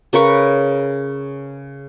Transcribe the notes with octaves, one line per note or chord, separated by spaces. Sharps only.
C#3 A#4 B4 C#6